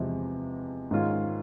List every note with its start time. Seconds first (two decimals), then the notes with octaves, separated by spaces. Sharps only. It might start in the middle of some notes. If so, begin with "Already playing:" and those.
Already playing: E2 C3 F3 G#3
0.91 G#2 D#3 G#3 C#4 F4